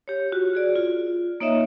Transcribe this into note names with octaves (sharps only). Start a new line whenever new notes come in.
G4 C#5
F4 F#4
F#4 G#4 D5
F4
A#3 D#4 C#5 D#5 E5